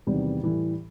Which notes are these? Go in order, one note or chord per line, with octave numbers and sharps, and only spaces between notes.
E2 C3 D#3 G3 B3
A2 E3 G3